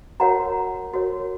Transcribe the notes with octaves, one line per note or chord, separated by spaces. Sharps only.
F#4 A#4 C#5 F#5 A#5
F#4 A#4 C#5